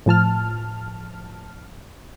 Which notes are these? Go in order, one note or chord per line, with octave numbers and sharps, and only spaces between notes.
A2 F3 A5 F6